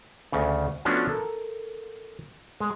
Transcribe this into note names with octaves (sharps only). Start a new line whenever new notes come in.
D2 C#3
F3 A3 B3 C#4 D4 F#4
A4 A#4
G#3